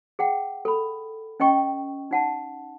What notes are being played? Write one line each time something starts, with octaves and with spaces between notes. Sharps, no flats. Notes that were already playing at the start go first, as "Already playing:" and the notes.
G#4 F#5 G5
A4 B5
C#4 D#5 G5 C#6
D#4 F#5 A5